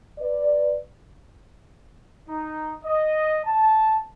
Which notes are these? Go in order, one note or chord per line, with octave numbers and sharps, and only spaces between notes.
B4 D5
D#4
D#5
A5